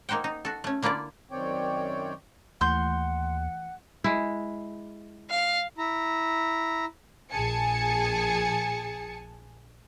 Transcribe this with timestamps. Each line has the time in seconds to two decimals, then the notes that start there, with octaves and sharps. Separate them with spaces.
0.09 A#3 D#4 C5 F#5 G5
0.24 D#4
0.45 F#4 A4
0.64 A3 C#4
0.82 D3 A#3 E4 F4 D5
1.31 F#2 D#3 C4 C#5 D5 G5
2.61 D#2 E3 A3 F#5 C6 G6
4.04 G#3 E4
5.30 F5
5.78 E4 A#5
7.31 A#1 G#4 G#5 A5 C#7